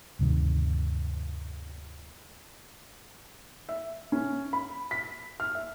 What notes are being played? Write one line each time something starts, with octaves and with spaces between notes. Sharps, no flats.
D2 G2 C3 D#3
E5
C#4
B5
B6
F6
E5